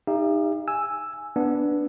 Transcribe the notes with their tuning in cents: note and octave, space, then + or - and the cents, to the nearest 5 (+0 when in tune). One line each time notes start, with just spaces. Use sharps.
D#4 +0 G4 +35 F5 -45
G#5 +0 E6 +0
B3 +0 D4 +0